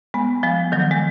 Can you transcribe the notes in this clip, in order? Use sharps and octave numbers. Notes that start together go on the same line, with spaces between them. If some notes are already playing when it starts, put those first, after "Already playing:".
G#3 B3
F3 G#3
D#3 F#3
G#3